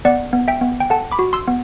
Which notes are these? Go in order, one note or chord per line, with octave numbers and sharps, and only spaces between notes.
B3 D5 F#5
B3
E5 G5
B3
G5
A4 F#5 A5
B5 D6
F#4
C6 E6
B3